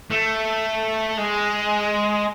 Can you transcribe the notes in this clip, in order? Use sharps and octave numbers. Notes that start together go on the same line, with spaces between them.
A3
G#3